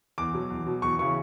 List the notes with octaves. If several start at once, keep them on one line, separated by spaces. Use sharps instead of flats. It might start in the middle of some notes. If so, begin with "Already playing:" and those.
E2 D6
B2 F#3
E2
B2 F#3
E2 C#6
C#3 E3 C#6